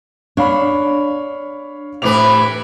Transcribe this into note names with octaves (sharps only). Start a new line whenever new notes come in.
D4 C#5 F5 B5
A2 C3 E3 B4 D6 F7